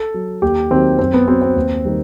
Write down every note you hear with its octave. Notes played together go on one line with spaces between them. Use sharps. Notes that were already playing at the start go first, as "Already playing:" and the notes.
Already playing: A4
F#3
D#2 G4
D#3 F#3 C4
F#2 C4
B3
F#3 C4
C4
D#2
D#3 G3